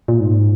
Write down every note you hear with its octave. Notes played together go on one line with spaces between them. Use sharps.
A#2
G#2